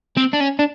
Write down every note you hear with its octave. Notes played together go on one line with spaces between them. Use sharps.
C4
D4
C#4
D4